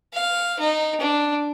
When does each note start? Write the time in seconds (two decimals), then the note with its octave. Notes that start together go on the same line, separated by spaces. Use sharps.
0.14 F5
0.59 D#4
1.00 D4